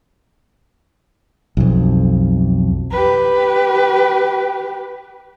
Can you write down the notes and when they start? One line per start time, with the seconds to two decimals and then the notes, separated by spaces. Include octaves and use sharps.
1.57 B1 F2
2.91 G4 B4